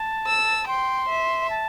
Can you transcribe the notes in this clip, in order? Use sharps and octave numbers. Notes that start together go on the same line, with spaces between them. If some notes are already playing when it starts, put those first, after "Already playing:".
Already playing: A5
E6
G5 C6
E5
A5